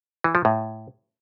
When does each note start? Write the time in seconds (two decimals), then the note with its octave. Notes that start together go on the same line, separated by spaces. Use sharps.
0.24 E3
0.35 F3
0.45 A2